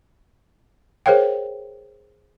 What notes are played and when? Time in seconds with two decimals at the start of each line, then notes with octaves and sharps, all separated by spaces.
1.06 G#4 A#4 C5 C#5 F5 G5